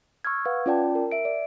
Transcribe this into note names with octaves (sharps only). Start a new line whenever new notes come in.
C#6 E6 F6 G#6
B4 F5 F#5 G#6
C#4 F4 D5 G5 A5
A#4
E5 D7
D5